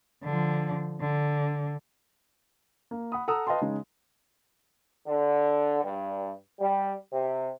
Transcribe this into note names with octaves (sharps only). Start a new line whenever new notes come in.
D3 F3
D3
A#3
F#5 B5 D#6
A4 F#5 A#5 D#6 E6
B4 D#5 F5 G5 A5 C6
C#3 G#3 D#4
D3
G2
G3
C3